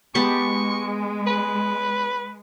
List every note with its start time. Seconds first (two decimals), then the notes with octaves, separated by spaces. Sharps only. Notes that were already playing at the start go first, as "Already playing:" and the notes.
0.15 G#3 B3 G4 A5 C#6
1.27 B4